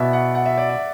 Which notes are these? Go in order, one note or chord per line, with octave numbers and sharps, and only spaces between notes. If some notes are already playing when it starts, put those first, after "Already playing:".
Already playing: B2 B3 E4 D5 E5
F#5
F#5
E5
D5
E5